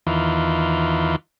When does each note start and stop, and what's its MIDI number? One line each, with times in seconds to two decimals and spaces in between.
0.07 1.16 40
0.07 1.16 51
0.07 1.16 52
0.07 1.16 65